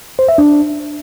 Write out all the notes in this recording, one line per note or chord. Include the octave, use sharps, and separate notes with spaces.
C5
E5
D4